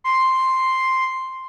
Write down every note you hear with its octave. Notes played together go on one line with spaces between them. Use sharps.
C6